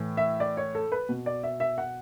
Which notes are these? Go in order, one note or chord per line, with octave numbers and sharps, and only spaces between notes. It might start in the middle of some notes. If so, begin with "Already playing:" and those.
Already playing: A2 E3
E5
D5
C#5
A4
B4
B2
D5
E5
E5
F#5